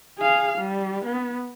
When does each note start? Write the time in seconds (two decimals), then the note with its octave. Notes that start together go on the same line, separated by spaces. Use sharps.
0.19 G#4 F5
0.59 G3
1.06 B3